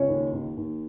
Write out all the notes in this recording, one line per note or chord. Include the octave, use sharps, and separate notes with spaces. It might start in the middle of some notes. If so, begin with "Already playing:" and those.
Already playing: C#2 C#4 C#5
D#2
D#2
D#2